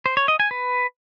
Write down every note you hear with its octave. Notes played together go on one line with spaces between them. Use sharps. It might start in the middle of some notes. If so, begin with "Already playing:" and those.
C5
C#5
D#5
G#5
B4